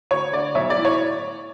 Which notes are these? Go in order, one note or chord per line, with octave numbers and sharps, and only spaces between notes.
D2 C#5
D3 D5
B1 C#5 E5
D5
A2 E3
C#5